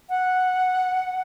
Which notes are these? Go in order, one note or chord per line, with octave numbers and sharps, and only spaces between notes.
F#5